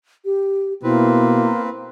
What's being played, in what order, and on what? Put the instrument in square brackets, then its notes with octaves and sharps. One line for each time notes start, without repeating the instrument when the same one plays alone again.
[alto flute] G4
[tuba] B2 [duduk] A#3 [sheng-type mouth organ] C4 B4 [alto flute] E4